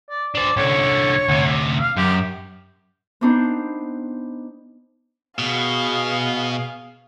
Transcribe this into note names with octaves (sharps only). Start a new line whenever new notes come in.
D5
D4 C5 D5
C2 D3 C#5
D2 C3
F5
F#2 G4
B3 C4 D4 D#4 C5
B2 G#4 F5